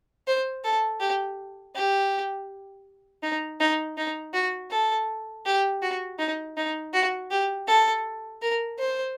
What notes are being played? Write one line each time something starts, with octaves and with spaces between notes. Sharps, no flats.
C5
A4
G4
G4
D#4
D#4
D#4
F#4
A4
G4
F#4
D#4
D#4
F#4
G4
A4
A#4
C5